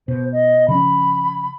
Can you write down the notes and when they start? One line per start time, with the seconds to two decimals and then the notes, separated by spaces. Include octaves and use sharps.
0.08 B2 C5
0.32 D#5
0.68 C#3 F3 C#4 B5